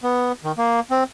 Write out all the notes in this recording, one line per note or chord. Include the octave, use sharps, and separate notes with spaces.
B3
D#3
A#3
C4